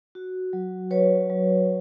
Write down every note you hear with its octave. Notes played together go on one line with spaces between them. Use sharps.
F#4
F#3
F#3 B4 C#5
F#3